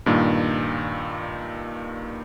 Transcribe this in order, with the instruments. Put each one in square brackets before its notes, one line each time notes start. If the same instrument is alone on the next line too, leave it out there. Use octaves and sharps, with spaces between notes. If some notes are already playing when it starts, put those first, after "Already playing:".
[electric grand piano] G2 A#2 D#3